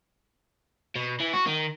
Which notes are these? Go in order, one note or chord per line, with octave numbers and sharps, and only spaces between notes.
B2
E3
F#4
D#3